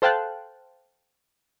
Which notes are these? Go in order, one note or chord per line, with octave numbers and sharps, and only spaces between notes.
A4 C5 F5 G5 A5 F#6